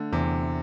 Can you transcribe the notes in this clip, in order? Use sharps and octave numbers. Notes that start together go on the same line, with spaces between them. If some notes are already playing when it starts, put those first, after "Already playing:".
Already playing: D3 A3
E2 C3